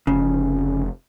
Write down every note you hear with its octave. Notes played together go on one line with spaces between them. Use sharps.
F1 C#3